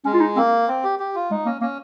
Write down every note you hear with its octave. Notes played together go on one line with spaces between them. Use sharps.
G#3 C#4
F4
D#4
A#3 C4
C4
G4
G4
F4
G#3 D#4
A#3 C#4
A#3 C#4